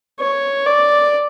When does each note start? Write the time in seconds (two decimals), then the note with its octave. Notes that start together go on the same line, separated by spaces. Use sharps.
0.20 C#5
0.66 D5